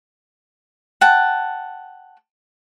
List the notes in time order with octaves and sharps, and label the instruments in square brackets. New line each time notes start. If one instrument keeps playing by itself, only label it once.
[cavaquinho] F#5 G5 A5